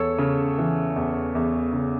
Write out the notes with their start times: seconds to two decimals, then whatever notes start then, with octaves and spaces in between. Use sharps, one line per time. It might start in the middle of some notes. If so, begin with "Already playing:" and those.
Already playing: E2 A4 C#5
0.18 C#3
0.58 E3
0.96 E2
1.35 E2
1.73 C#3